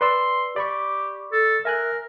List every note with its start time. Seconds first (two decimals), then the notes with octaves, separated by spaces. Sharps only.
0.01 B4 D5 C6 E6
0.56 G4 D5 B5 C#6
1.32 A4
1.65 A#4 E5 G#5 F#6